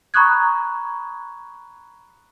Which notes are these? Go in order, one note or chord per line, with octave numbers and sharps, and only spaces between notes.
A#5 B5 C#6 D#6 F#6 G#6